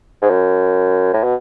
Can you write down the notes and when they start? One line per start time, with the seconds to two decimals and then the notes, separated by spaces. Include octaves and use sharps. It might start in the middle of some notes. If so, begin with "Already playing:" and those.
0.22 G#2
0.30 F#2
1.13 A2
1.24 B2